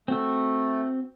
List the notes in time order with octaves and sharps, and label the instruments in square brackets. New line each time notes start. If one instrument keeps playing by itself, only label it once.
[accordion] A3 [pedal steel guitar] C4 F#4 E6